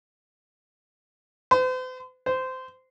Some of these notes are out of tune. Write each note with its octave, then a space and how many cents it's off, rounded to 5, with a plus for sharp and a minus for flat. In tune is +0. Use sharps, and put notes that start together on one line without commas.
C5 -45
C5 -20